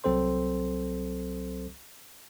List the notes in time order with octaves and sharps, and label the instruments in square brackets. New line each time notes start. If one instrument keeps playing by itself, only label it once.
[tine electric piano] C2 F#3 C4 A4 C5 C6